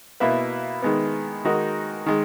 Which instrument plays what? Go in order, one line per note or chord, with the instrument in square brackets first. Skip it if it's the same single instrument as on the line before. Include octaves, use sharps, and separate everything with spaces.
[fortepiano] B2 A#3 E4 B4 E5
D#3 G#3 B3
D#3 G#3 D#4 F#4 A#4
D#3 G#3